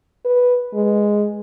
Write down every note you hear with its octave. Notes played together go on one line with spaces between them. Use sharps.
B4
G#3